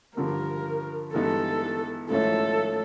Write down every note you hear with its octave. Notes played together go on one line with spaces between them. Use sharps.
G2 D3 F3 A#4
G2 E3 G#3 B3 D#4 A4
G#2 F3 A3 C#4 E4 A4